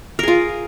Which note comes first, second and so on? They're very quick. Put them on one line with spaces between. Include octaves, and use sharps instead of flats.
A#4 G#4 F4